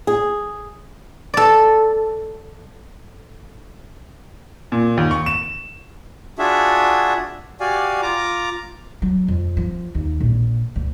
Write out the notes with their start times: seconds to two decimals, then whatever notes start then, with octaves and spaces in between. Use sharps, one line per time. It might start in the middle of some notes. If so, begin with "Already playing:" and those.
0.07 G#4
1.34 A4 D5
4.72 A#2
4.97 D#2
5.11 C#6
5.26 E7
6.39 D4 F4 F#4 G#4 E5
7.60 F#4 G4 D5 F5 G#5
8.02 F4 A#5 D6
9.02 F#3
9.28 F2
9.57 F3
9.95 D#2
10.20 A#1
10.76 D2